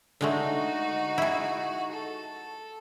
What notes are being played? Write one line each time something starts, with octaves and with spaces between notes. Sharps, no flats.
D3 G#3 A3 D#4 F#4
E4 G#4
A4